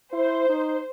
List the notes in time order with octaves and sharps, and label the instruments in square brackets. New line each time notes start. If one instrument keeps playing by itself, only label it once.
[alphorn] E4 [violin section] C5
[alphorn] D#4